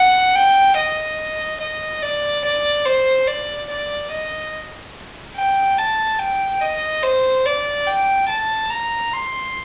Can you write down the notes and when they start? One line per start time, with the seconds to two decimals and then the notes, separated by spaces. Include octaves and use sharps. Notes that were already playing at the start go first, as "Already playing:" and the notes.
Already playing: F#5
0.36 G5
0.77 D#5
1.60 D#5
2.02 D5
2.44 D5
2.86 C5
3.27 D5
3.70 D5
4.11 D#5
5.36 G5
5.78 A5
6.19 G5
6.61 D#5
7.03 C5
7.45 D5
7.87 G5
8.29 A5
8.70 A#5
9.13 C6